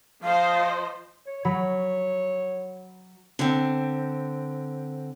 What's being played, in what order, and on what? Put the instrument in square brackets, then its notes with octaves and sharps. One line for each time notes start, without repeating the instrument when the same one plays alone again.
[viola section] F3 C5 D#5 [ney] F5
[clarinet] C#5
[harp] F#3 B5 [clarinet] C#5
[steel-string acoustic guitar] D3 C4